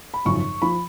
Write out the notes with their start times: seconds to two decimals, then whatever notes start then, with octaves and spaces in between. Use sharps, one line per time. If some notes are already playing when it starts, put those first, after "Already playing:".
0.14 B5
0.25 G#1 F#2 C#3 F3 C#6
0.62 F3 B5